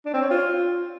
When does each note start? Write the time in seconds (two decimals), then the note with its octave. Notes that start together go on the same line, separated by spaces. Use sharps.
0.05 D4
0.14 C4
0.22 C#5
0.30 F4